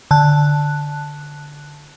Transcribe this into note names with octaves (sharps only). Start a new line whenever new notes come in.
D3 A5 F#6